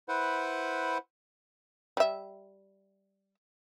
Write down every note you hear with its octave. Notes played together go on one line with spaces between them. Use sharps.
E4 B4 C5 F#5
G3 E5